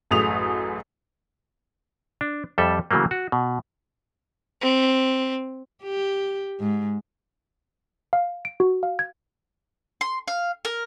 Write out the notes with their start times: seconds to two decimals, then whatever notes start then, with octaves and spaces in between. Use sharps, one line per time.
0.11 A1 F#2 A3 G#4 D#6 F7
2.21 D4
2.58 F2 G3 A4 E5
2.91 C#3 E3 F#3 A3 A#3
3.11 F#4
3.32 B2
4.61 C4
5.83 G4
6.60 G#2
8.13 F5
8.45 D7
8.60 F#4
8.83 F5
8.99 G#6
10.01 C6
10.28 F5
10.65 A#4